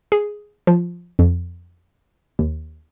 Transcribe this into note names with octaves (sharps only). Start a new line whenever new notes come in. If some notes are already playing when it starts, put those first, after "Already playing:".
G#4
F3
F2
D#2